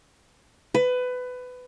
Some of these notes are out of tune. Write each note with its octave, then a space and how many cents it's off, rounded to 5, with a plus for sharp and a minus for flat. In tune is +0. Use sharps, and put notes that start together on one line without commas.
B4 +20